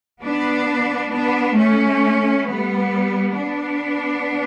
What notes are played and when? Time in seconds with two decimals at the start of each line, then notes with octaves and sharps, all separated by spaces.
0.22 B3 D4
1.12 B3 D4
1.56 A3 C#4
2.46 G3 B3
3.35 B3 D4